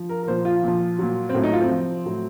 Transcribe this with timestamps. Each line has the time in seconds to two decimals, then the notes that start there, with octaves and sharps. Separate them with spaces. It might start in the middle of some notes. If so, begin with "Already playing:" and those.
Already playing: F3
0.09 A#4
0.23 A#4
0.27 A#2 F3 C5
0.45 F4
0.63 A#2 F3
0.98 A#2 F#3
1.29 C4
1.35 A2 F#3 C#4
1.44 D#4
1.53 F4
1.61 C4
1.70 C3 F3
2.06 A2 F#3